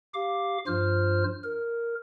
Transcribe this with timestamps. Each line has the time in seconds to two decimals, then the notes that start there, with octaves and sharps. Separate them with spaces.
0.14 G4 F5 D6
0.67 G2 F3 F4 C5 F6
1.44 A#4